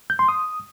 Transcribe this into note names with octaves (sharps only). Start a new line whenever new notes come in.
G6
C6
D#6